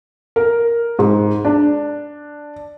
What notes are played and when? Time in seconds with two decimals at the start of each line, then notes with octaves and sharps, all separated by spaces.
0.36 A#4
0.99 G#2
1.45 D4